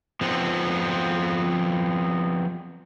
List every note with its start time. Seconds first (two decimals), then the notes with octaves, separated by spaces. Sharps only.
0.21 F3 B3 C4